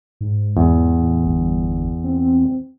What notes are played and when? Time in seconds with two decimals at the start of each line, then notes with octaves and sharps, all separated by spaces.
0.21 G#2
0.57 E2
1.01 A2
1.26 G1
2.04 C4